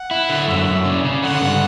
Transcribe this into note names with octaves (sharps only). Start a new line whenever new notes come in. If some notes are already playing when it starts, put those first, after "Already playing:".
Already playing: F#5
E4
D3
F#2 E5
F#2
C#3 D5
C#3
D3 F#5
G2